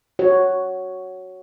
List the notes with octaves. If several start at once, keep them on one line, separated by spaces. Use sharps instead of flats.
F#4 C#5